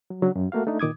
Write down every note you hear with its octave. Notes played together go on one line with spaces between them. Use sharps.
F#3
C#3 F#3 D4
F#2
A3 A#3 F#4 F5
A3 D4 D#4
A#2 D#3 D6 D#6 G#6